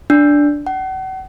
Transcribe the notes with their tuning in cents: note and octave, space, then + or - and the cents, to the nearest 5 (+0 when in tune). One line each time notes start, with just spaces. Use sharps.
D4 -5
F#5 +40